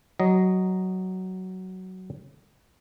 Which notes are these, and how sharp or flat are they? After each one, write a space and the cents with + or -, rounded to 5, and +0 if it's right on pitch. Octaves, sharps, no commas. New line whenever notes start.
F#3 +10 D#5 +0